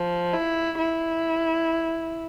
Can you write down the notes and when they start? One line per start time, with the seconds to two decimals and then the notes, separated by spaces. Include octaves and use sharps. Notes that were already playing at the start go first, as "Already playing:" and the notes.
Already playing: F3
0.33 E4
0.78 E4